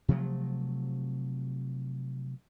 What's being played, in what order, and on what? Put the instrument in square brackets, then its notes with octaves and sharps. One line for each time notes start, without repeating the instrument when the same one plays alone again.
[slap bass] C3 F3 F#3 A3